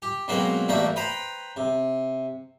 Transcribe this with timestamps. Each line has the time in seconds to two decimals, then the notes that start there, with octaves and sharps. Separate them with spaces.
0.02 G4
0.28 B2 F#3 G#3 A#3 C4 F#4
0.68 A1 G3 A3 A#3 F#4 G5
0.96 B4 C5 G5 A#5
1.56 C3